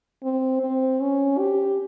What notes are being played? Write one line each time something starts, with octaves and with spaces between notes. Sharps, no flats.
C4
C4
C#4
G4